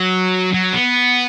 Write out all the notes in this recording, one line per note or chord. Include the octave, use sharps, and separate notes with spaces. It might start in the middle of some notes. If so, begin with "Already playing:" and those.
Already playing: F#3
F#3
B3